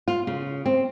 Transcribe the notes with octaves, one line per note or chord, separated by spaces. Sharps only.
F4
C#3
C4